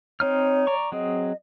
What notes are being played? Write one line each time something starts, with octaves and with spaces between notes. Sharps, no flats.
C4 D#4 C#5 F6
D5 A#5 C#6
F#3 C4 G#4 D#5